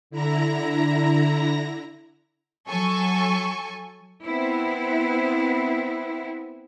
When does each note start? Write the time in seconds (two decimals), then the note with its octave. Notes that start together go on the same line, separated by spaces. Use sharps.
0.10 D3 E4 A#5 A#6
2.69 F#3 A4 G#5 C#6
4.25 B3 C4 E4